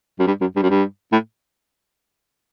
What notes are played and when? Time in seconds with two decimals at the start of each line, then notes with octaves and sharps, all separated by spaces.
0.19 F#2
0.27 G2
0.41 F#2
0.56 G2
0.62 F#2
0.70 G2
1.12 A2